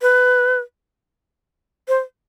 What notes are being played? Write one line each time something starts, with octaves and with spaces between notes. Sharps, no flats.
B4
C5